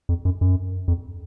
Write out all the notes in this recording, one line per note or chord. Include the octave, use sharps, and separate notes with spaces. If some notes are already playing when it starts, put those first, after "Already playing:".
F2
F#2
F#2
F2